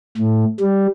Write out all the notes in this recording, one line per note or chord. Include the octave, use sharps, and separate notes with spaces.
A2
G3